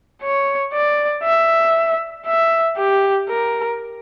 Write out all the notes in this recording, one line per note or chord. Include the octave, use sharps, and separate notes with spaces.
C#5
D5
E5
E5
G4
A#4